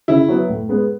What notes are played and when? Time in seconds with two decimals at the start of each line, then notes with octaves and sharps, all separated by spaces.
0.08 C#3 E4
0.28 F#3 B3
0.49 A2
0.69 G#3 B3